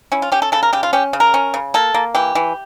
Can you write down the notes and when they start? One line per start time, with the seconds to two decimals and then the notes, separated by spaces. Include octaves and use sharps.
0.12 C#4 E4
0.22 F4
0.32 C#4 G4
0.42 A4
0.52 C#3 A4
0.63 A#4
0.73 C#3 G4
0.83 F4
0.93 C#4 G4
1.13 C#3
1.20 A#4
1.34 C#4
1.54 C#3
1.74 A#3 A4
1.94 A#3
2.15 E3 G4
2.35 E3